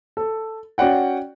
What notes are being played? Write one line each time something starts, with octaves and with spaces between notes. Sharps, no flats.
A4
C#4 F#4 D5 F#5 G5